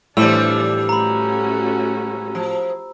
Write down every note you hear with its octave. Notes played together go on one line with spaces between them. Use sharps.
A2 E3 F3 G3 D4 E6
A3 C#4 F#4 A#5 B5
F3